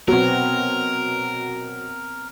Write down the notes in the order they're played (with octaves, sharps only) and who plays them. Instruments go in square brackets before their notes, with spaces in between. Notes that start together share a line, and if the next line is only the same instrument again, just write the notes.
[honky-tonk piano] B2 F#3 [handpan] B3 C4 [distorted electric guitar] A#4